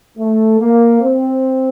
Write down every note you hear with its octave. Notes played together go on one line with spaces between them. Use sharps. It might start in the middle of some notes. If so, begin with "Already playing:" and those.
A3
A#3
C4